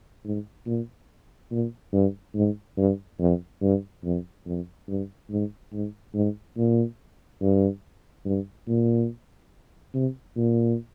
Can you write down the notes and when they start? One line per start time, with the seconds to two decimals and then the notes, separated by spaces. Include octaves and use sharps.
0.25 G#2
0.66 A#2
1.51 A#2
1.93 G2
2.35 G#2
2.77 G2
3.19 F2
3.62 G2
4.04 F2
4.46 F2
4.88 G2
5.30 G#2
5.73 G#2
6.14 G#2
6.57 A#2
7.41 G2
8.25 G2
8.68 A#2
9.94 C3
10.36 A#2